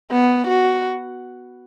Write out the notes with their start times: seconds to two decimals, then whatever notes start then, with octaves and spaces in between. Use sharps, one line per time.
0.11 B3
0.47 F#4